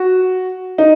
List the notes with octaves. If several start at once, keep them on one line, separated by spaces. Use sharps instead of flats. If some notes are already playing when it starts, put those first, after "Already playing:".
Already playing: F#4
D#4